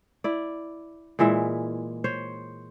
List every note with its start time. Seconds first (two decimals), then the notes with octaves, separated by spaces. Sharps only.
0.24 E4 D5
1.19 A#2 E3 G#3 E5
2.04 C5 C#5